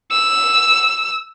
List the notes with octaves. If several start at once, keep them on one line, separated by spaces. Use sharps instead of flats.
E6